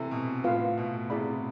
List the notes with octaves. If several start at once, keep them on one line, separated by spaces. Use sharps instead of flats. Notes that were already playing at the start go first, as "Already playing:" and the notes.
Already playing: C3 E3 E4 A4 E5
B2
A2 F4 B4 F5
B2
C3 E4 G#4 D5 F5 B5